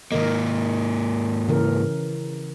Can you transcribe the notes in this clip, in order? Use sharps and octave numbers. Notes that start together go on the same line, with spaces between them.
G#2 D#3 A#3 A#4 D#5
C#3 E3 A#4